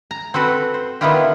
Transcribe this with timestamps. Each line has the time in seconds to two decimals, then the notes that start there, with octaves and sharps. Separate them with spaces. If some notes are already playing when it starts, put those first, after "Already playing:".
0.11 A#5
0.34 C4 F#4 A4 B4
0.74 C5
1.01 D#3 B3 D4 E4 F4 G4